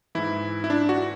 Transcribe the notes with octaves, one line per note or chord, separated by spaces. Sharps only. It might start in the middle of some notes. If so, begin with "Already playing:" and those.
G#2 E3 E4
E4
D4
F#4